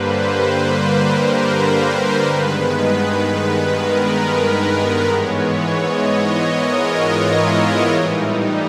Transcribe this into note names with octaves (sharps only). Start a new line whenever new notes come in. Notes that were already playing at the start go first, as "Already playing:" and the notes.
Already playing: G2 D3 G3 A#3 B4 C5
B4
A#4
B4
C5
G2 D#3 G#3 B3 B4
A#4
B4
G#2 E3 G#3 B3 C#5
D#5
A#4
F4
E4
A2 E3 G3 D#4